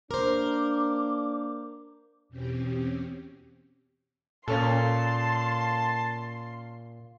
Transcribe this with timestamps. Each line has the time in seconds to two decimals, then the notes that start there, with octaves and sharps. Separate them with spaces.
0.11 A#3 D4 A#4 C5 D6
2.29 E2 B2 C4 C#4 G4
4.48 A#2 A#3 C#4 A4 A5 C6